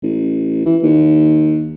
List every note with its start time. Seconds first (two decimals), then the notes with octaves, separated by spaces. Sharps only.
0.03 A1
0.66 E3
0.83 D#2